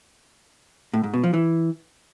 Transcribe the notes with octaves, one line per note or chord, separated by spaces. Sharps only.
A2
G#2
B2
F3
E3